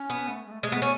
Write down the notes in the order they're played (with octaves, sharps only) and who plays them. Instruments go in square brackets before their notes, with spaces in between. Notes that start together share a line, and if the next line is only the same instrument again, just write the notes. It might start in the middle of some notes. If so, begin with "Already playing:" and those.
Already playing: [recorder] C#4
[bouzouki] B3
[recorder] A3
G#3
A3
[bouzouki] G#3 [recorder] A3
[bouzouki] B3
C#4